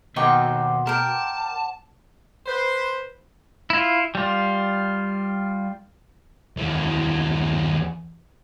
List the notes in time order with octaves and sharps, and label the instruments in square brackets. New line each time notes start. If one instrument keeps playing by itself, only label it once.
[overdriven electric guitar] D#2 [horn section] B2 [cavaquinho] D#4 G5 C#6 [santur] C5 F#5 D6
[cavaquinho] A#4 G5 [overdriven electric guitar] A5
[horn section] B4 C5
[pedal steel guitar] E4 F4
G3 F4
[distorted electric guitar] D#2 E3